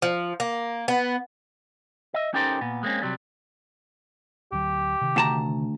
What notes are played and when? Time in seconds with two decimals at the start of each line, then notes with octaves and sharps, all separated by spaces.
0.02 F3
0.40 A#3
0.88 B3
2.14 D#5 E5
2.34 C#4 D#4 G4 A4 A#4 C5
2.61 A#2 B3
2.83 G#3 A#3 C4 C#4
3.02 C3 F#3 G3
4.52 D1 D2 F#3 G4
5.01 C3 D#3
5.16 D2 A5 A#5